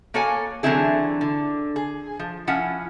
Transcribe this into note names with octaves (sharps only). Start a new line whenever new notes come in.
A#3 F#4 A4 C#5 F5 G#5
D3 E3 F#3 C4 E4 G#4
D3
G#4
F3
F3 C#4 E4 F#5